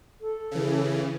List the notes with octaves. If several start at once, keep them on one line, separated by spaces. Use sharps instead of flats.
A4
C#3 E3